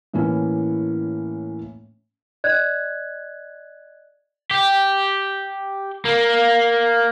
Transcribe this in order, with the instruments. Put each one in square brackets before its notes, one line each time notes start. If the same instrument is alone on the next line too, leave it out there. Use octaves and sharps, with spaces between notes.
[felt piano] A2 E3 A#3 C#4
[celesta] D5 D#5 F#6 G#6
[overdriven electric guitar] G4
A#3